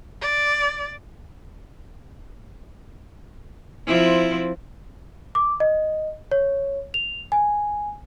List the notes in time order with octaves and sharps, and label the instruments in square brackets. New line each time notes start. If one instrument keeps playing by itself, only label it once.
[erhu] D5
[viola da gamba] F3 C4 E4
[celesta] D6
D#5
C#5
F7
G#5